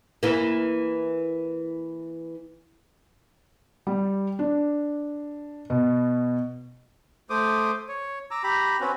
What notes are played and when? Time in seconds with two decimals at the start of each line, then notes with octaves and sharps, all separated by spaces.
0.23 E3 A#3
3.87 G3
4.39 D4
5.70 B2
7.30 A3 C5 D6 D#6
7.89 C#5
8.31 A#5 D6 E6
8.43 G4 A#5 B5
8.80 C4 C#4 F#4 B4